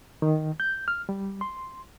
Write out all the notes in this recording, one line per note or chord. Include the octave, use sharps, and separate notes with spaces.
D#3
G6
F6
G3
C6